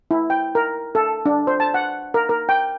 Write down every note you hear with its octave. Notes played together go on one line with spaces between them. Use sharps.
E4
G5
A#4
A4
D4
C5
A5
F#5
A#4
A#4
G5